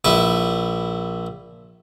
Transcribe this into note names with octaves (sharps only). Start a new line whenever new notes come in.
A#1 E4 B4